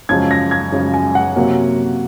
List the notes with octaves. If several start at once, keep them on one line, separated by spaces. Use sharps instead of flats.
F#2 C#3 F3 G#3 G#6
A#6
G#6
F#2 C#3 F3 G#3
G#5
F#5
C3 F#3 A#3